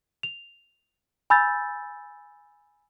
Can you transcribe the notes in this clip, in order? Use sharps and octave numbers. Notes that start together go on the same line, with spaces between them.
F7
G#5 B5 E6 G6 A6